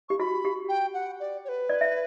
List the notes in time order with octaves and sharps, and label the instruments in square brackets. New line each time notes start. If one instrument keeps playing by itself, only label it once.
[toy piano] G4 [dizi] C#6
[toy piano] F#4 [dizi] B5
[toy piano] G4
[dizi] G5
F#5
D5
C#5
B4
[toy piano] D5
E5